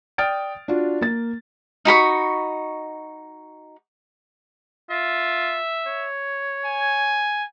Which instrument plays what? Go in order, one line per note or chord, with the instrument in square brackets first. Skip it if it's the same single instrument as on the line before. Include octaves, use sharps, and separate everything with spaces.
[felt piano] D5 G5 D#6 F6 A6 D7
D4 F4 F#4
A#3 A6
[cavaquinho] D#4 F#4 B5 C#6
[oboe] F4 [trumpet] E5
[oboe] C#5
[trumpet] G#5